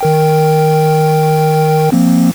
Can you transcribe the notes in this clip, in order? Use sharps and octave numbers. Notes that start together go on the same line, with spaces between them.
D#3 A#4 G5
F3 A#3 C4